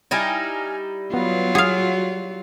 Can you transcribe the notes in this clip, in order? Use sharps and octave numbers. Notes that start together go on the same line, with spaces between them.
G3 D#4 E4 G#5 F6 G#6
F#3 B3 F4
F#4 G#4 F5